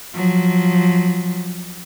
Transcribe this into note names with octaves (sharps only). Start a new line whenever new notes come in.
F3 F#3